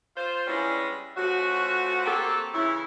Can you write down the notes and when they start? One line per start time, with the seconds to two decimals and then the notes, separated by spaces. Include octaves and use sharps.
0.17 F4 C5
0.47 G3 G#3 B3 C#4 D4 E4
1.17 F3 A3 C#4 F#4
2.06 A#3 C4 F#4 G4 A4
2.54 C#3 E3 C#4 E4